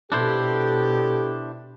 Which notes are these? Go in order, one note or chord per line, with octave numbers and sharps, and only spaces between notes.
B2 D4 E4 G4 A4 C5